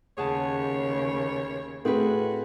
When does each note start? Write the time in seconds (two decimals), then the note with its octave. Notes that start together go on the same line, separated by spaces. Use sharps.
0.17 D#2 C#3 G#4 C#5 F#5 A5
1.85 A2 A3 C4 F#4 G#4 B4